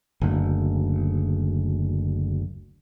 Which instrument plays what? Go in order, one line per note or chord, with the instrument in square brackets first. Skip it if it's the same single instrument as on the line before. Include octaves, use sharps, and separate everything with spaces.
[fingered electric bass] F#1 D2